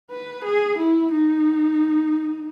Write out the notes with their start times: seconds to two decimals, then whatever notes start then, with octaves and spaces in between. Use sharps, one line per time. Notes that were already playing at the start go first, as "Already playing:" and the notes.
0.11 B4
0.44 G#4
0.78 E4
1.11 D#4